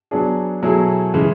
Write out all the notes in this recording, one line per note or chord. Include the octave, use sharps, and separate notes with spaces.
F#3 B3 D4 G#4
B2 F#3 A3 E4 G#4
C#3 E3 G#3